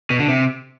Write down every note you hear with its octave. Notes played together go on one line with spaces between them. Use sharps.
B2
D3
C3